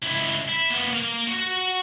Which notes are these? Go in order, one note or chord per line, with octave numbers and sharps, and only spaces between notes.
C#2 E4
E4
A#2 B3
A#3 F5
F#4